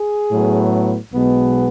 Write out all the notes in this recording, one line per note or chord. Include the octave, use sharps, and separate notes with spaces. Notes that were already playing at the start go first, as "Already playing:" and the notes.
Already playing: G#4
A2 F#3 B3
B1 B2 G#3 B3